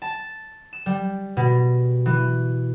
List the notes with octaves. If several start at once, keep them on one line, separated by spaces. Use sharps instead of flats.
A5
E7
G3
B2
E3